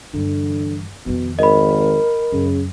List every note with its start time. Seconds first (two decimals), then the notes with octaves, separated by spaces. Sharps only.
0.14 G2 D3 E3
1.06 F2 B2 D#3
1.39 G#1 A#4 D#5 B5
2.32 F#2 C#3